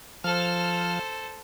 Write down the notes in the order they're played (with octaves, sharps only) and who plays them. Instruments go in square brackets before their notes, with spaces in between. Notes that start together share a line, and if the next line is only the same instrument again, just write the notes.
[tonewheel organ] F3 F6 [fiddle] A4 C5